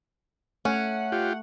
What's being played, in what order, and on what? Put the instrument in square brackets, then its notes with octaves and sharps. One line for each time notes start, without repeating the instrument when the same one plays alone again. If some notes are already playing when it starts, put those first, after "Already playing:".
[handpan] A3 [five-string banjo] C#4 [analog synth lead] F#5
[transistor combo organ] F4 G4